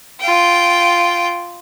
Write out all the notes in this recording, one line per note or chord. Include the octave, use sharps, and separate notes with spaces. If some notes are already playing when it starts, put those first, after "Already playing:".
F4 G5